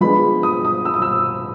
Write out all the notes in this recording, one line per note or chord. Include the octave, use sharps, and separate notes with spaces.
F3 G#3 B3 D4 B5
D#6
D#6
E6
D#6
E6